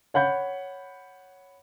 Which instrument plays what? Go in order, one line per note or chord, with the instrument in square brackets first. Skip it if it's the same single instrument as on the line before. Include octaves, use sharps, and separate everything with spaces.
[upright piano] C#5 F#5 B5 G6